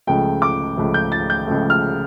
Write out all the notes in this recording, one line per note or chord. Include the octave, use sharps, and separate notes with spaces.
C#2 C#3 F3 A3 G5
D6
C#2 C#3 F3 A3
G6
A6
G6
C#2 C#3 F3 A3
F6